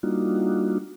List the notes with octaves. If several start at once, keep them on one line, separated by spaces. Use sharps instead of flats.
G3 A#3 D4 D#4 F4 F#4